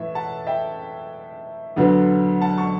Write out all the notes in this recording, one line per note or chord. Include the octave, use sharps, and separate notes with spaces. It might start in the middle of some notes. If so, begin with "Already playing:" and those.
Already playing: A2 E3 E5
F#5 A5
E5 G5
D2 D3 F#3 B3
F#5 A5
A5 C#6